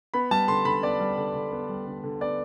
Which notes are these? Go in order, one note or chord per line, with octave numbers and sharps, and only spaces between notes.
B3 B5
G3 A5
D3 C6
D3 B5
B3 D5
G3
D3
D3
B3
G3
D3
D3
B3 D5